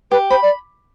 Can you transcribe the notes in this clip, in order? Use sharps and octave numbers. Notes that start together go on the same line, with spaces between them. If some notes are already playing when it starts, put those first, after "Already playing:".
G4 B4
C5 B5
D5